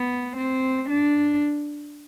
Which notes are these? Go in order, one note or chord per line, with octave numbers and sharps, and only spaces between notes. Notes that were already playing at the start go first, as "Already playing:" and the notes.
Already playing: B3
C4
D4